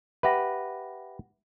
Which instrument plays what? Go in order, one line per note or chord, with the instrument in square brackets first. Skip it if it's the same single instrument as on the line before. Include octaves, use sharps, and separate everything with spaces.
[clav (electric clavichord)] G4 B4 [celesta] E5 F#5 A#6